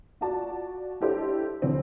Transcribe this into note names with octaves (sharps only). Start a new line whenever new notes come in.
F4 F#4 D5 A5
D4 E4 G4 A4 C5 D#5
D2 E3 C4